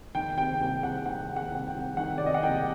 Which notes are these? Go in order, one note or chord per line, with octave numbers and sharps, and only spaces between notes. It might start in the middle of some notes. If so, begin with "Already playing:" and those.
D#3 G5
C3 G5
C2 G5
C2 F#5
D#3 F#5
C3
F#5
C2 F#5
G5
C2
D#3 F#5
C3 D5
D#5
F#5
C2 G5